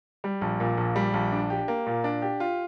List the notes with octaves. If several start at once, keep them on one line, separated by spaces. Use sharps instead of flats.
G3
A#1
A#2
A#1
G3
A#1
D4
G4
A#3
A#2
D4
G4
F4